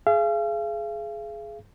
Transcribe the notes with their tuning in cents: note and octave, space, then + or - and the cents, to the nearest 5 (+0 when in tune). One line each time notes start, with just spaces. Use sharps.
G#4 +20 F5 -40